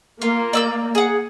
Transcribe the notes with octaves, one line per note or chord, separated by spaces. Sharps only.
A#3 F4
D5 E6 G6
G#4 F#5